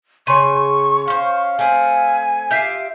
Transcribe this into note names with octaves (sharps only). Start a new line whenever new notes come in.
C#3 C#5 C6 C#6 D#7
C#4 C5 F5
A3 C4 G#5
F4 G4 E5 G6 B6 C7